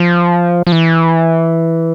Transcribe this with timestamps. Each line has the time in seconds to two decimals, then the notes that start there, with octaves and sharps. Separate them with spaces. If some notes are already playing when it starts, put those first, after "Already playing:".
Already playing: F3
0.67 F3
0.72 E3